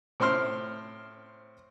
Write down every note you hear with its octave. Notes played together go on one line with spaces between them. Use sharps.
A2 C4 C5 C6 F6